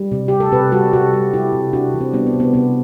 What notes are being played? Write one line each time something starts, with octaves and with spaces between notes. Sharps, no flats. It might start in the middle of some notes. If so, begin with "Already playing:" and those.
Already playing: G3
C3
G3 G4
A4
C3 G4 B4
G3 F#4 A4
C3 F#4 A4
G3
G3 E4 G4
C3
C3 D4 F#4
E3
C4
G3 B3 D4
C4
C3
B3
C3 B3